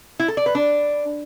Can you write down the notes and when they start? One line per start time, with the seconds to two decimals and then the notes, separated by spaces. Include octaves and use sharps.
0.19 E4
0.28 A4
0.37 D5
0.46 B4
0.55 D4